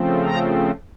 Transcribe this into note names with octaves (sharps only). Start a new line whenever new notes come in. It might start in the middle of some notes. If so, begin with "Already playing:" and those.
Already playing: C#3 F3 A3 C4
A#5